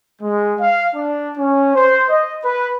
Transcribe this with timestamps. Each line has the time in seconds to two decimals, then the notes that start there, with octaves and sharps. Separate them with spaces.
0.21 G#3
0.60 F5
0.94 D4
1.37 C#4
1.74 C5
2.09 D#5
2.44 B4